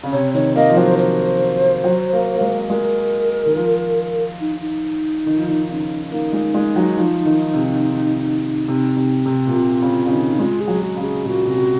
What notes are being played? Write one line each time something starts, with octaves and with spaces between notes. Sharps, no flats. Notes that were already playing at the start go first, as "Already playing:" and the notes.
C#3
C3 C#5
D#3 C#5
A#3 D#5
F3
F#3 C5
C5
F#3
A#3
A#3
G#3
A#3
G#3 A#4
D#3
F3
D#4
D#4
D#3
F3
D#3
C#3
A#3 D#4
G#3
G#3
F#3
F3
D#3
C3
C3
C3
C3
A#2
C3 F4
C#3
C#3
D#3
D#4
G#3 F4
G#4
F#3
F#4
C#3
G#4
A#2 F#4
C3